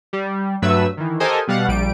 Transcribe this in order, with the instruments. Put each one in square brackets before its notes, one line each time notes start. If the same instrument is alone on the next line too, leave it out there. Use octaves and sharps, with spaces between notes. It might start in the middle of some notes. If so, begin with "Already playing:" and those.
[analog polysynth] G3
G2 F#3 A3 B4 E5 E6
D#3 E3
G4 A4 A#4 C5 D#5 G#5
B2 G3 F5 F#5
A#1 G3 D7